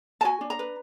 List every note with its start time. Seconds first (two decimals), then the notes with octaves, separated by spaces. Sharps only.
0.21 A5
0.24 F#4 G#5
0.41 D4
0.50 A#5
0.59 B4